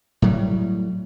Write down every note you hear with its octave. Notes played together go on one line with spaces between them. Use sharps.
A2 F#3 G3